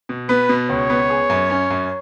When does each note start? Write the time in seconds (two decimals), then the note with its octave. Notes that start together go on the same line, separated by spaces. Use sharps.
0.09 B2
0.29 B3 B4
0.49 B2
0.69 C#2 C#5
0.90 B3
1.10 G#4
1.30 F#2
1.50 C#4
1.70 F#2